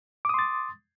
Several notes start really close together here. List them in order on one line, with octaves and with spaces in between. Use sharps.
D6 D#6 C6 A6